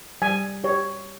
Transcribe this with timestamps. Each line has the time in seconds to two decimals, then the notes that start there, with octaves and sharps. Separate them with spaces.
0.22 G3 G#5
0.64 G4 C#5